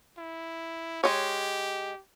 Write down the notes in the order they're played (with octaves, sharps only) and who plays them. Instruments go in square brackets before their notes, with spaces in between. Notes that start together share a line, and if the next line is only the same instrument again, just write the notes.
[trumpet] E4
[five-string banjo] G#3 C#5 [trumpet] G4